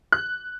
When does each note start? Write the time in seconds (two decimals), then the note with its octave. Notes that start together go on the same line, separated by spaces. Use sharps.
0.12 F#6